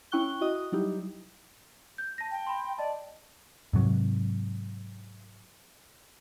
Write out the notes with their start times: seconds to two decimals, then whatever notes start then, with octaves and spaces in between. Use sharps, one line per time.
0.12 C#4 E4 G5 C#6 F#6 G7
0.41 E4 F#4 D#5 D#6
0.72 F#3 G3 D#4 E4 G4
1.98 G6
2.18 A5 A#6
2.31 G5
2.47 B5 C6
2.78 D5 D#5 A5
3.73 G#2 C3 F#3